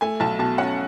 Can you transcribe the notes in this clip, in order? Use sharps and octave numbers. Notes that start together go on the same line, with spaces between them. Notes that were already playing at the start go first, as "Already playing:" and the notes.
A3 G#5
B1 A5
B2 A5
C#4 F#5